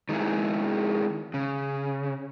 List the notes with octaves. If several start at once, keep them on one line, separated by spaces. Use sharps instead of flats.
D#3 G#3 A#3 E4 G#4
C#3